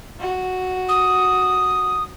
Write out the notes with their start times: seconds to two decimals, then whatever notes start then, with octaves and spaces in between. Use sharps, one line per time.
0.20 F#4
0.89 D#6